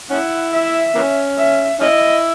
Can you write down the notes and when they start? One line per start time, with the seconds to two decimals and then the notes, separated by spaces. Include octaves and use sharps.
0.10 C#4 E4 F#5
0.53 E5
0.95 E3 A#3 C#4
1.38 E5
1.80 C#4 E4 D#5